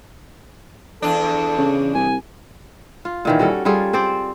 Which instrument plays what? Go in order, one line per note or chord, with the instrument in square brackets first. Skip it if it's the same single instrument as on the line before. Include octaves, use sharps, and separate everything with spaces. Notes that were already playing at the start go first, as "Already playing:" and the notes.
[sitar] E2 D4 [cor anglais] A4
[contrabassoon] C#3
[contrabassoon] C2 [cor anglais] G#5
[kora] F4
A#2 D#3 E3
G3 C#4 F#4 A4
G3 F4 G#4 A4
C4 C5 D5